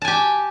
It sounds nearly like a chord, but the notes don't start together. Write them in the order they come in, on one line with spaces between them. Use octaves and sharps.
A5 G#5 G4